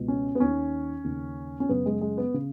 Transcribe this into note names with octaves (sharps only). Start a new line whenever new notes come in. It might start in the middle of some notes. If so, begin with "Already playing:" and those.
Already playing: C#2 B2
C#4
B3
D#2 D#3 C#4
D#2 C#3
C#4
F#2 C#3 B3
G#3
G#3
B3
C#3